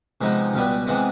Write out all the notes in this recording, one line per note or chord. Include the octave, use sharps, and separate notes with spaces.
C3 F3 G#3 B3 D#4
C#2 B2 G3 B3 F5
C3 E3 G#3 B3 F#5